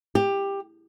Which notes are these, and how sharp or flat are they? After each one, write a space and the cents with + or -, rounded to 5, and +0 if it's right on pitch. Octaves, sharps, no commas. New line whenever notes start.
G4 +15